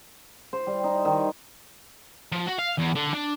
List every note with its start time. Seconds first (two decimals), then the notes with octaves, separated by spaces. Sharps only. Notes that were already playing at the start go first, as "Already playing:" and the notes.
0.53 C5
0.67 G3
0.84 D#4
1.05 D#3
2.32 F3
2.47 F#4
2.59 F5
2.79 E2
2.95 D3
3.14 D4